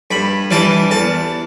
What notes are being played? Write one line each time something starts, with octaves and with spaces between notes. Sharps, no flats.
G2 B5
E3 G3 D4 A5
E2 A5